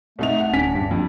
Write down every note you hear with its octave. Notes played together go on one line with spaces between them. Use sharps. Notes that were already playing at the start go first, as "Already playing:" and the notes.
C2 A3 D#4 F7
F#5
D1 C#4 D4 B6
G2
F2